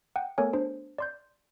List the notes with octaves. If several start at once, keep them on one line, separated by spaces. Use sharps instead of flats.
F#5 G5
A3 B3 A4 A#4 C#5 G#5
D4 C5
D5 C6 G6